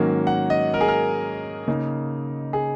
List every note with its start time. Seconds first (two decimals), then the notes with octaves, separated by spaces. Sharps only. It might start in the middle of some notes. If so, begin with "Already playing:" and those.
Already playing: G#2 D#3 F#3 A#3 C#4
0.27 F#5
0.50 D#5
0.74 A#4
0.81 G#4
0.88 A#4
1.68 C#3 A#3 D#4
2.53 G#4